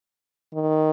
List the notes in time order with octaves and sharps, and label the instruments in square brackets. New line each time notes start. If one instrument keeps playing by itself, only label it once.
[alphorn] D#3